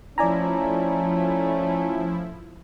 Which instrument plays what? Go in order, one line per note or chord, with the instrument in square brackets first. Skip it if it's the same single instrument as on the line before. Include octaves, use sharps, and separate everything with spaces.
[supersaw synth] F3 E4 [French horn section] A3 C#4 [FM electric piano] D5 G#5 A#5